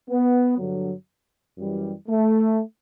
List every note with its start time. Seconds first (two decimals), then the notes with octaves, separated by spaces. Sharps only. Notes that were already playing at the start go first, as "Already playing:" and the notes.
0.08 B3
0.58 G2 D3 F#3
1.58 F#2 E3 G3
2.08 A3